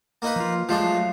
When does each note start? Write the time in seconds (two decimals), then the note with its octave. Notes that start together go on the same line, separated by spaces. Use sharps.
0.22 A#3 D#4 B4
0.36 F3 F4
0.69 F3 F#3 G#3 A3 D4 F5